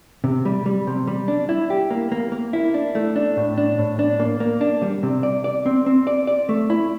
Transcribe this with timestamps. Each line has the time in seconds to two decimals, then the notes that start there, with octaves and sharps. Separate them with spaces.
0.24 C3
0.45 G3
0.66 G3
0.87 C3
1.07 G3
1.28 D4
1.49 E4
1.70 G4
1.91 A#3
2.12 A#3
2.32 A#3
2.53 E4
2.74 D4
2.95 A3
3.16 D4
3.37 A2
3.58 D4
3.78 A2
3.99 D4
4.20 A#3
4.40 A#3
4.61 D4
4.82 G3
5.03 C3
5.23 D5
5.44 D5
5.66 C4
5.86 C4
6.07 D5
6.27 D5
6.49 A3
6.70 E4